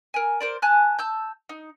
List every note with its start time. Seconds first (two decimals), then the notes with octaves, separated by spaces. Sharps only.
0.14 A#4 G#5
0.40 A#4 C5 D5
0.62 G#5 A5 F#6
0.99 A5 E6 G6
1.49 D#4